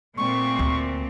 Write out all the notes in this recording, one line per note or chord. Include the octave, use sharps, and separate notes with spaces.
A#2 A3 C4 C#6
D2